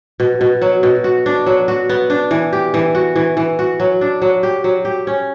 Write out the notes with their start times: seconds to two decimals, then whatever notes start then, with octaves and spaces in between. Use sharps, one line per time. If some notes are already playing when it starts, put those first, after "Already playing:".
0.20 B2
0.41 B2
0.62 F#3
0.83 B2
1.04 F#4
1.26 D4
1.46 F#3
1.68 F#4
1.89 B3
2.10 D4
2.31 E3
2.53 G4
2.74 E3
2.95 F#4
3.16 E3
3.37 E3
3.59 F#4
3.80 F#3
4.01 D4
4.22 F#3
4.43 G4
4.64 F#3
4.85 G4
5.07 C#4